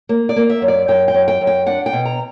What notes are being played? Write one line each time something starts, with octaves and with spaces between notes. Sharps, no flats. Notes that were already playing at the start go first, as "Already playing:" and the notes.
A#3
D5
A#3
E5
F#2
D5
F#2 G5
G5
F#2
G5
F#2
G5
D4 F#5
G5
B2
A#5